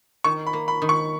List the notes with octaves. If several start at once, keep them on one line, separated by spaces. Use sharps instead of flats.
D#3 C#6
B5
A#3
B5
D#3
C#6